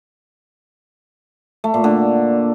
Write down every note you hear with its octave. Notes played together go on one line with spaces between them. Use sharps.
A3
A#2
D3